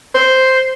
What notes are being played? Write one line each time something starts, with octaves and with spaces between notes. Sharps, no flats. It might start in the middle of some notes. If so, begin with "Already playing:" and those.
C5